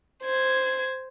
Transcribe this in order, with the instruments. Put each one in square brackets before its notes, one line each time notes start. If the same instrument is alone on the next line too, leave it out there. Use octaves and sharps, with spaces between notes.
[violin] C5 G#6